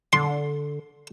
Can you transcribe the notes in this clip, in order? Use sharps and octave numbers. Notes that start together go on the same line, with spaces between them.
D3 C6